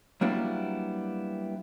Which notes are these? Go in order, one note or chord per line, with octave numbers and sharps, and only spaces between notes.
F#3 G3 A#3 B3 D4 E4